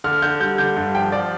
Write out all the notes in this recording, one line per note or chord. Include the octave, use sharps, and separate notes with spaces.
D3 F6
D3 G6
G3 G6
D3 G6
G2
F3 G5
F3 D5